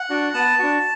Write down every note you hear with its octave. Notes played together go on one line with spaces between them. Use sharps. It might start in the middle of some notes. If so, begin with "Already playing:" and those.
Already playing: F#5
D4 F#4
B3 A5
D4 F#4